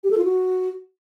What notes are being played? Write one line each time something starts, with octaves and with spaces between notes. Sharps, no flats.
G4
A4
F4
F#4